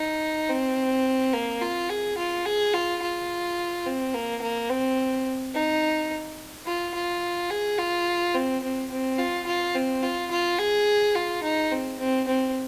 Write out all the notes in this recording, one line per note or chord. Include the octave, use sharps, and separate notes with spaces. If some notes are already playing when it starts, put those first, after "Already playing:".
Already playing: D#4
C4
A#3
F4
G#4
F4
G#4
F4
F4
C4
A#3
A#3
C4
D#4
F4
F4
G#4
F4
C4
C4
C4
F4
F4
C4
F4
F4
G#4
F4
D#4
C4
C4
C4